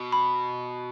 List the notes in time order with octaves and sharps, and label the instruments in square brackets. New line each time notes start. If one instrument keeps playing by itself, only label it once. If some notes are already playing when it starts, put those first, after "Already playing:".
Already playing: [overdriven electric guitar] B2
[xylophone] B5